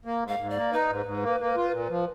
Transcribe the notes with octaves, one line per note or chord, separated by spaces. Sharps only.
A#3
G#2
F5
G#2
D5
A#3
D#4 B4
G#2
G#2
A#3
A#3
F4
A#2
F3